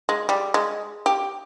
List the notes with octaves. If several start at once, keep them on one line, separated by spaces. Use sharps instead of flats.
G#3
G3
G#3
G4